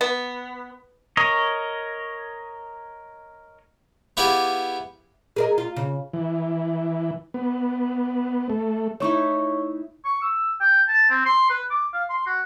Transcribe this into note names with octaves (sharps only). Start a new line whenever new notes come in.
B3
A#4 C#5 D#5
B3 E4 G4 G#4 D5 F5
G#4 A#4 D#5
F4
C#3
E3
B3
A3
A3 D#4 E4 C#5 C#6
C#6
E6
G5
A5
C4
C6
B4
D6
F5
C6
F#4